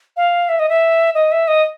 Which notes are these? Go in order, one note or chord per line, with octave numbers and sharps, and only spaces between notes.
F5
E5
D#5
E5
D#5
E5
D#5